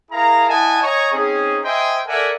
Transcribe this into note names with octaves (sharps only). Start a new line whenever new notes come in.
E4 G#4 A#4 F5 A#5
E4 D#5 F#5 G#5 A5
C#5 D#5 G#5 A#5 C#6
C4 C#4 D#4 G#4
C5 D#5 E5 G5 G#5 C6
A4 A#4 D5 E5 F#5 G#5